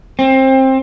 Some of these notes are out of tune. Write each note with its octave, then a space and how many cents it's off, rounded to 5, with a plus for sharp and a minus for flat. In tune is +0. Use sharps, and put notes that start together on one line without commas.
C4 +20